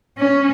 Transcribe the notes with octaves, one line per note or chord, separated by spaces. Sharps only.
C#4